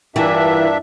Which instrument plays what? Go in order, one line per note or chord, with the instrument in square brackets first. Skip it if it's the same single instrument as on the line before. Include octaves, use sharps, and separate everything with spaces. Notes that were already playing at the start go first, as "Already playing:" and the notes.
[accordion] G2 D4 E5 [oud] E3 [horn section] F4 G4 A#4